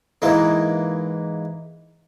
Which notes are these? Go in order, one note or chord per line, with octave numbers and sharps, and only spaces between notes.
G#2 E3 G#3 A#3